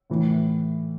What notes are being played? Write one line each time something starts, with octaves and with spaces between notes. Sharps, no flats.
A2 E3